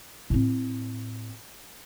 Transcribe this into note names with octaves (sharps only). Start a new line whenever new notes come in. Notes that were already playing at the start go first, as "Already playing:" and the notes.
A2 C4